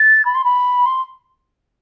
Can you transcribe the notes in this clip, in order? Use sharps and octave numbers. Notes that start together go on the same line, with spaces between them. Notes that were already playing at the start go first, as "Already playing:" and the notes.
Already playing: A6
B5
C6
B5
C6